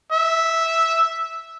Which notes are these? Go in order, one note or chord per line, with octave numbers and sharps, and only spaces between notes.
E5